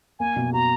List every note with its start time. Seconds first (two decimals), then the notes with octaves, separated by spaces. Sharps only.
0.19 A#3 G#5
0.36 B2
0.52 F#4 A#5